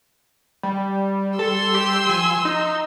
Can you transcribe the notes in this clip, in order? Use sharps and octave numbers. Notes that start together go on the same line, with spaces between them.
G3
G3 A4 C6 E6
G4
F3 G#5
D#4 A#5